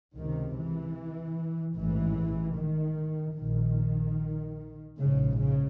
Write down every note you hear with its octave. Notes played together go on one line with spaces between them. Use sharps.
C#2 C3 D#3
E3
A1 G#2 E3
D#3
A#1 A#2 D#3
A#1 G#2 C#3
C#3